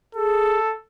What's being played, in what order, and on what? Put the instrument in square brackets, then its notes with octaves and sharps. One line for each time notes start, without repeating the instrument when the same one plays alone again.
[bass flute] G#4 [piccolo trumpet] A4